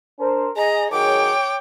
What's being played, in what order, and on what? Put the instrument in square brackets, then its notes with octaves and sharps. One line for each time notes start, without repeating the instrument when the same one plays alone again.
[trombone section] D4 A#4 C5
[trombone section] G#4 [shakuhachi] D#5 [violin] A#5
[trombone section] D#3 F#3 G#4 [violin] C#5 G5 [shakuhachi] D6